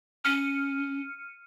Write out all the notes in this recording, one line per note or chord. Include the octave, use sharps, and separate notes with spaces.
C#4 F6 C#7 D#7